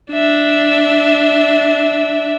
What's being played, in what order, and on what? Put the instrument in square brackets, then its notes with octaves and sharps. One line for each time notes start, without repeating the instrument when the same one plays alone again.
[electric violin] D4 E5